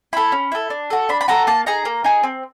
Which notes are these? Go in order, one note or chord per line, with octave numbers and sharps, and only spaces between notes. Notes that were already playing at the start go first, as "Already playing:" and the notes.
E4 A4 B5
C#4
E4 A4
D4
F#4 A4
D4 B5
B5
F#4 A4 A#5
A#3 A5
D#4 G#4 A#5
A#3
D#4 G#4
C4